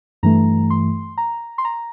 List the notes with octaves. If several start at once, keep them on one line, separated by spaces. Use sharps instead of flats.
G2 E3 A3 A#5
C6
A#5
C6
A#5